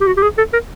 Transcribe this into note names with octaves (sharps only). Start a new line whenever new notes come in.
G4
F#4
G4
G#4
A4
A#4